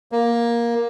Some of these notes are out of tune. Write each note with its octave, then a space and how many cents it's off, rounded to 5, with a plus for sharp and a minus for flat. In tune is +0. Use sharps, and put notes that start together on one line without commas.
A#3 +10